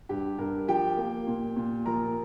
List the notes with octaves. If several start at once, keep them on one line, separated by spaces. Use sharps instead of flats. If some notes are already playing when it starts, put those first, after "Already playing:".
G2 G4
G2 A#4
F3 G4 G5
A#3
A#2
A#2
F3 A#4 A#5